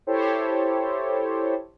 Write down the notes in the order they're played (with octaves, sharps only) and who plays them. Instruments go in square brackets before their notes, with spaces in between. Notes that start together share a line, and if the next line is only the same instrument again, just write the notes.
[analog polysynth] E4 G4 A4 C5 C#5